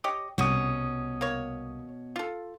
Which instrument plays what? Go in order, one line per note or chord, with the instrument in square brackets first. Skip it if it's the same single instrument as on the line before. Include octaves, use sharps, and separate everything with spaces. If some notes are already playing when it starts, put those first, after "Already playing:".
[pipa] G4 C#5 D#5
[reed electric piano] C2 D#6 [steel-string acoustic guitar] B2 C#4 [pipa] F#4
[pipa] A#3 C#5
F4 A4